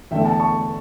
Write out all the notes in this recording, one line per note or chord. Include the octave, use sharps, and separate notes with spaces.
E2 D3 A3 E5 G5
F#5 A5
A5 C#6